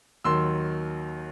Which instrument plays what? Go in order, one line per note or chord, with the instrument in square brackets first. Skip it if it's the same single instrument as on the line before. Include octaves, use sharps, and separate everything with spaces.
[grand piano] D#2 D#3 F#3 C6 E6